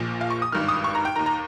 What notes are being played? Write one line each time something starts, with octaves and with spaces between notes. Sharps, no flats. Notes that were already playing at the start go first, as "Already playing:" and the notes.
Already playing: A#1 A#2 F3
F5
C#6
D#6
G#1 G2 D#3 F6
D#6
C#6
A#5
G5
D#2 D#3 A#5
A#5